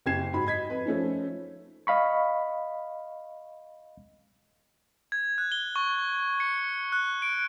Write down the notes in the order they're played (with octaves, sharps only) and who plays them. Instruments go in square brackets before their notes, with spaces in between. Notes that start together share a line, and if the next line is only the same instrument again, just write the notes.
[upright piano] F#1 G4 G#6 C7 E7
G#2 F#4 B5
D#5 G#6 B6
F2 B4
F3 A3 C#4 D#4
[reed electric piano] D#5 F5 B5 C#6
[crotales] G#6
F#6
G7
C#6
C#7
F#6
D7